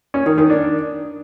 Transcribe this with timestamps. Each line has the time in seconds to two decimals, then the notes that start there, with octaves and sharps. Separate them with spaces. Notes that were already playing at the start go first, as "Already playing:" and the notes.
0.14 C#4
0.26 D#3
0.38 D#3
0.50 D4